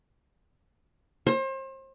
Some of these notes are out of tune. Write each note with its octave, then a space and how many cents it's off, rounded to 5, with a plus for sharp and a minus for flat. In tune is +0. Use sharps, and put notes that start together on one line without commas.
C5 +35